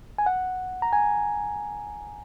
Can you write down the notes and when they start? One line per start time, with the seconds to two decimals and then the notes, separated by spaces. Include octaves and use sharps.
0.18 G#5
0.26 F#5
0.82 A#5
0.93 G#5